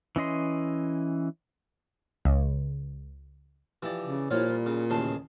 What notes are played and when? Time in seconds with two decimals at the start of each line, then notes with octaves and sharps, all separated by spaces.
0.16 E3 C#4 D#5 C6
2.25 C#2
3.83 E3 F3 G4 D5
4.04 C#3
4.31 A#2 F3 E4 F4 G4 C#5
4.48 G3
4.66 C#3
4.90 A1 D#2 C#3 G#4 A5 C6